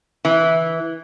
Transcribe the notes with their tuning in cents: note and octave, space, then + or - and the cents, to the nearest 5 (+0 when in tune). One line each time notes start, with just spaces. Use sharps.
E3 -10